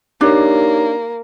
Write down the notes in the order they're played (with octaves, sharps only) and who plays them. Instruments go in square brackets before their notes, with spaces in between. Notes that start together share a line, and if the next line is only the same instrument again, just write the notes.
[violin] A#3 [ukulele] D4 [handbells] D#4 G4 C#5